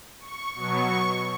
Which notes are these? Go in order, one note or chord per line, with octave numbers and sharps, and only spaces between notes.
C#6
B2 F#3 B3 C#6